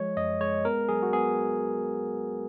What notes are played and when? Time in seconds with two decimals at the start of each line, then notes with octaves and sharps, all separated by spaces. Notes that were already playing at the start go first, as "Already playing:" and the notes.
Already playing: F3 G#3 C#5
0.17 F#2 D#5
0.41 G#3 C#5
0.65 B3 A#4
0.89 F#3 G#4
1.03 F#4
1.13 B3 G#4